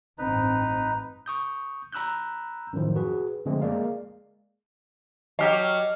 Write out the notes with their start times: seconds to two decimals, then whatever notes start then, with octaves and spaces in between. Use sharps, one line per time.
0.18 A1 G2 C4 D#4 B4
1.26 C#6 D#6 G6
1.93 A#5 B5 E6 F#6 G6
2.73 F#2 A2 D#3 F3
2.96 F#4 G#4 B4
3.45 F#2 D3 F3 G#3 A3 C4
3.62 G#3 A#3 G#4 D5 F5
5.39 F#3 G4 D#5 F6